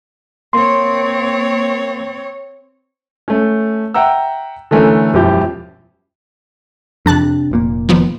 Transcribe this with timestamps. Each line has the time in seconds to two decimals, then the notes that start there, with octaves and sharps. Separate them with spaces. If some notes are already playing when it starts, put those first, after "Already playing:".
0.53 A#3 C4 C#5 C6
3.28 A3 C#4
3.94 E5 F#5 G5 A#5 E6
4.71 D3 E3 A3 C#4 A#4
5.13 E1 F#2 F3 E4 G4 G6
7.06 F2 C3 D4 A5 F#6
7.51 F1 A#2 A#3
7.89 D#3 F3 B3